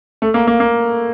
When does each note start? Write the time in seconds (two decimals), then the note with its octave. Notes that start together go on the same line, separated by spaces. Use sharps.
0.22 A3
0.34 A#3
0.47 A#3
0.60 A#3